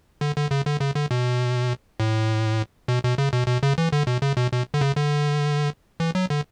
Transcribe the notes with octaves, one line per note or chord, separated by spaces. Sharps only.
D3
D3
C#3
D3
C#3
D3
B2
A2
B2
B2
C#3
B2
B2
C#3
E3
D3
B2
C#3
B2
B2
D3
C#3
D3
E3
F#3
D3